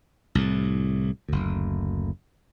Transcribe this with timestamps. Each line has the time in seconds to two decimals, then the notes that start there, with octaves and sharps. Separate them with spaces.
0.35 C2 A2
1.28 F#1 D2